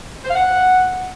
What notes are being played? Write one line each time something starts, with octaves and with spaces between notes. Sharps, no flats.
C5
F5
F#5